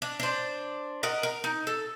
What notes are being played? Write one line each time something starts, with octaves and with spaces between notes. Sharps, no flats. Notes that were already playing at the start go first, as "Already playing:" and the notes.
D4
D4 C5
A#4 D#5 F#5
A#4
D#4
A4